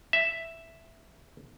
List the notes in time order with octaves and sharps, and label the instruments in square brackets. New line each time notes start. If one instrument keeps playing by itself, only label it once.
[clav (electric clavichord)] E5